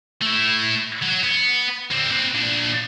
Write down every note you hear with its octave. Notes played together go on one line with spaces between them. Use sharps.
A3 E4
F#3
B3
D3 C4
C4 B4
A#2 D4